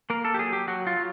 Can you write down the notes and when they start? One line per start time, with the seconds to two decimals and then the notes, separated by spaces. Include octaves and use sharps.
0.10 A#3 A#4
0.25 A4
0.34 G4
0.39 F#3 G#4
0.53 G4
0.67 F#3 F#4
0.87 F4
0.97 F#3